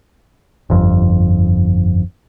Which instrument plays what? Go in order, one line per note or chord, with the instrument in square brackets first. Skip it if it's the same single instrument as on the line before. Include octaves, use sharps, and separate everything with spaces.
[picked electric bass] G1 F2